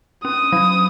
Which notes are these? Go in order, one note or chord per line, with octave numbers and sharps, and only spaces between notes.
C#4 D#6
F#3